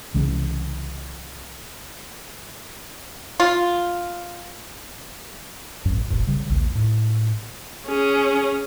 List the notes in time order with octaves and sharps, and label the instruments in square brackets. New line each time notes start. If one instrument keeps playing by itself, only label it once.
[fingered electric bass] C2 C#3 E3 G#3
[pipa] F4
[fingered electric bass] A1 F#2
E1 A1
C#3 G3
A#1 D#2
A2
[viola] C#4 G#4